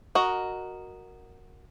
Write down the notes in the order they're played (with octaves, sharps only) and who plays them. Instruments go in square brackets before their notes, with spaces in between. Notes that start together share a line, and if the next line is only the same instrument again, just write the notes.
[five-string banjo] F#4 A#4 D#5